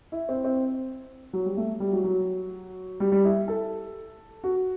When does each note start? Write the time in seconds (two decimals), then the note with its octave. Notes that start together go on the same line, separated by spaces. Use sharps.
0.12 E4
0.29 C4
0.44 C4
1.33 F#3
1.46 G3
1.57 A3
1.80 G3
1.93 F#3
2.04 F#3
3.00 G3
3.12 G3
3.24 E4
3.48 A4
4.44 F#4